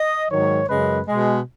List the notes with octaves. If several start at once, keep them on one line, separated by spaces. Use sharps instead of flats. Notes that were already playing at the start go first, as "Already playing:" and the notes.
Already playing: D#5
G#2 D#3 F#3 C#5
F#2 C#3 G#3 B4
B2 G#3